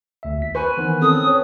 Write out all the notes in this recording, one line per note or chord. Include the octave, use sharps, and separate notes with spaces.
D2 E5
D#2 B6
B4 C5 G#5 C#6 F#6
D#3 E3 B3
C4 C#4 A4 D#6
B4 C#5